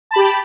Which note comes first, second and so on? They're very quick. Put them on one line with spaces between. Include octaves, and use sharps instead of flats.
A5 B5 G4